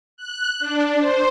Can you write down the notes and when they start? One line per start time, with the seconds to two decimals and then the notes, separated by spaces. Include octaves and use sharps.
0.17 F#6
0.60 D4
0.99 C5